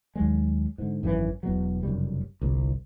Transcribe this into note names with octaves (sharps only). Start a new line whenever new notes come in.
D#2 F#3 G#3
G#2 D3
G#1 F#2 D#3 E3
E1 B2 F#3
F1 F#2 C#3 G3
G1 C2